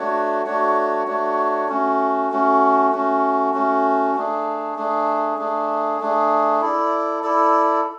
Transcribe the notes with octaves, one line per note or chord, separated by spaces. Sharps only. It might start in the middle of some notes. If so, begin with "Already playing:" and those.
Already playing: A3 D4 F#4 C#5
A3 D4 F#4 C#5
A3 D4 F#4 C#5
A3 C#4 F#4
A3 C#4 F#4
A3 C#4 F#4
A3 C#4 F#4
A3 D4 G#4
A3 D4 G#4
A3 D4 G#4
A3 D4 G#4
E4 A4 D5
E4 A4 D5